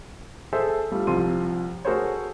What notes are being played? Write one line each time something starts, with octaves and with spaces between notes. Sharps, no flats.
G#4 A4 C5 E5
G3 A3 F4
C2 F3 C6 D#7
A3 F#4 G#4 A#4 C5 C#5